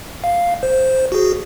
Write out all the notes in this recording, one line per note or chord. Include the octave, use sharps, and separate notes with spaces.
F5
C5
F#4 G#4